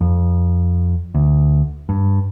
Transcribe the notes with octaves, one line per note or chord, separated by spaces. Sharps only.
F2
D2
G2